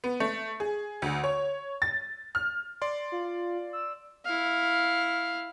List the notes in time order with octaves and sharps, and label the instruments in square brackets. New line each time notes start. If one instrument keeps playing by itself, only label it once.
[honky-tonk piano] B3
A3
G#4
D2
C#5
A6
F6
[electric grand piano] D5 C6
[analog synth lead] F4
E6
[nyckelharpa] E4 F5